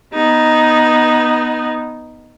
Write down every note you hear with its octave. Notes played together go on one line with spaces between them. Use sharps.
B3 D#4